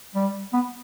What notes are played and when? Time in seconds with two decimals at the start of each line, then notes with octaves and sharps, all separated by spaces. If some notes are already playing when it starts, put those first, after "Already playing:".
0.15 G3
0.53 B3